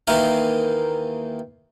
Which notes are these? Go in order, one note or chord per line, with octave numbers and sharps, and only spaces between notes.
D#2 D#3 E3 A#3 F5